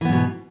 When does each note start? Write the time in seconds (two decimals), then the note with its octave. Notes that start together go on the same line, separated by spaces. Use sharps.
0.01 E3
0.05 B3
0.09 G#2
0.12 B2